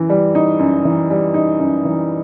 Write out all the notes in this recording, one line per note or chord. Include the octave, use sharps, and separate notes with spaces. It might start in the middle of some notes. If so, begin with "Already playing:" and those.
Already playing: F#2 E3
G3
D#4
F#2
E3
G3
D#4
F#2
E3